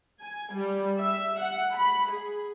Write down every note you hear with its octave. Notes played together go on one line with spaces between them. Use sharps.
G#5
G3
E5
F#5
B5
G#4